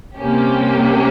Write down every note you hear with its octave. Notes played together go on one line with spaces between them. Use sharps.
C3 G3 A#3 C#4 G4